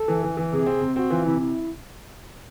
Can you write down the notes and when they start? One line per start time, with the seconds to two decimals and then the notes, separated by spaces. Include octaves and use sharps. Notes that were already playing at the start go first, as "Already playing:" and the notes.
Already playing: A4
0.08 E3
0.23 E3
0.37 E3
0.52 C3 G#4
0.66 C4
0.81 C3
0.96 C4 F#4
1.10 E3 F4
1.26 C3 E4
1.40 E4